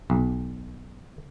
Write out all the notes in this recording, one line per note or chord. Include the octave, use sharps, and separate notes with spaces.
B1